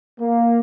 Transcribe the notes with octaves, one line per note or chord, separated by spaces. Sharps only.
A#3